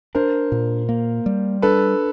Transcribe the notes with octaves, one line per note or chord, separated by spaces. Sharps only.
D4 A#4 C5
A#2
A#3
G3
D4 A4 B4